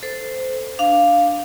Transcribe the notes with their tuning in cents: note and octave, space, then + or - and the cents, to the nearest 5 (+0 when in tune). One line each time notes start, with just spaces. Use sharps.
A4 +0 C5 -15
D4 +0 F5 +0